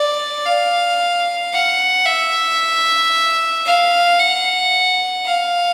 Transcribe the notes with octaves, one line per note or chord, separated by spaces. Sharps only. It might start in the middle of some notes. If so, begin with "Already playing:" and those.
Already playing: D5
F5
F#5
E5
F5
F#5
F5